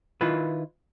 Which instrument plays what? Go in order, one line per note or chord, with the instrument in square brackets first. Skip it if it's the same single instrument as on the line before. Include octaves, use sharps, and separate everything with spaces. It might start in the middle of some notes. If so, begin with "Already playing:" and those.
[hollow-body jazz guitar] D#3 E4 F4 B4